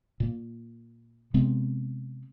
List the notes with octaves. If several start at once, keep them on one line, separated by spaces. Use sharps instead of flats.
A#2 A#3
C3 G#3 B3 C4